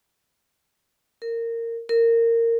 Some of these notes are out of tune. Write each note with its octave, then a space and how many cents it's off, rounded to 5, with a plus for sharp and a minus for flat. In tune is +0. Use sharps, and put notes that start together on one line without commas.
A#4 -20
A#4 -20